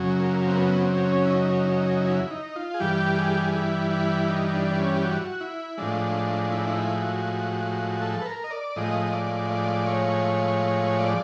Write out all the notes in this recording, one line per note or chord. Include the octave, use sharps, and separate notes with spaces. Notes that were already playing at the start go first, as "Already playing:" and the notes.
Already playing: F#2 C#3 F#3
A#3
C4
B3
C4
C#4
E4
D#4
D#4
E4
D#4
F4
G#4
G2 E3 G3 G4
G#4
G4
G#4
E4
E4
D#4
D4
D4
C#4
G4
F#4
E4
A2 F3 G#3 D4
E4
D4
D#4
E4
F#4
A4
B4
A#4
D#5
D5
A2 F3 G#3 D#5
D5
D5
C#5
D5